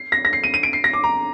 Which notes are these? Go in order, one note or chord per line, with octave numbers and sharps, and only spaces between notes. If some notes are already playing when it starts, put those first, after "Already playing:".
Already playing: C7
A#6
A#6
C7
D#7
D#7
D7
C7
A#6
D6
A#5